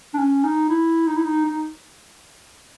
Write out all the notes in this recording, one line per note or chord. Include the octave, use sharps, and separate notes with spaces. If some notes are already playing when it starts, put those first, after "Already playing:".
D4
C#4
D#4
E4
D#4
E4
D#4
D#4